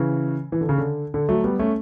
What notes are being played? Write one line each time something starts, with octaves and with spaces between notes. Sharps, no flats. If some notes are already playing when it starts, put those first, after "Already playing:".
Already playing: C#3 E3
E3
D3
C#3
D3
D3
F#3 A3
G3 B3
A3 C#4